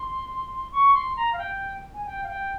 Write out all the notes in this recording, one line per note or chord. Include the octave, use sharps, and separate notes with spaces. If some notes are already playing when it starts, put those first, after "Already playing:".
Already playing: C6
C#6
C6
A#5
F5
G5
G#5
G5
F5
G5